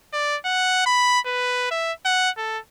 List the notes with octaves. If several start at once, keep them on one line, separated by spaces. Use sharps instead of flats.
D5
F#5
B5
B4
E5
F#5
A4